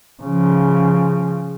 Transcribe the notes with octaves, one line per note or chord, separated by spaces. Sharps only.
C#3 F3